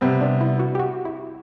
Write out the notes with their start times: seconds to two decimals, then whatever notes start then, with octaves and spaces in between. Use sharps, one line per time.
0.01 C3 G3 B3 C4
0.21 D4
0.41 E4
0.60 F#4
0.75 G4
0.79 F#4
1.05 E4